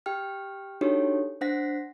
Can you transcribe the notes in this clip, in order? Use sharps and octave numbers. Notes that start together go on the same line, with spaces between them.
G4 G5 F6
D4 D#4 F#4 G4 A4 C#5
D4 C5 F#5 A#6 B6